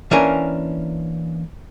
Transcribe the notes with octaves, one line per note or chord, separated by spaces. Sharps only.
E3 A#3 C#4 D4 A#4 G#5